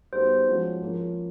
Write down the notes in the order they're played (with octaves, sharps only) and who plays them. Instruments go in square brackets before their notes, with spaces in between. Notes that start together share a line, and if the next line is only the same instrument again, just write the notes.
[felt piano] G3 B3 D#4 F#4 [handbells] C5
[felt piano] F3 G#3 C#4 F#4
F3 A#3 C#4